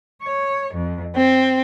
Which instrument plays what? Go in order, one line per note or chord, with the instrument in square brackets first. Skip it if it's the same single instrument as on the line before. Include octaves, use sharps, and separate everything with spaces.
[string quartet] C#5
F2
C4